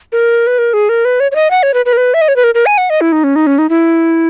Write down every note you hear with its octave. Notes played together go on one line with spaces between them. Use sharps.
A#4
B4
A#4
G#4
A#4
B4
C#5
C#5
D#5
F#5
C#5
B4
B4
A#4
B4
E5
D#5
C#5
B4
A#4
A#4
G#5
F#5
D#5
E4
D#4
C#4
D#4
C#4
D#4
E4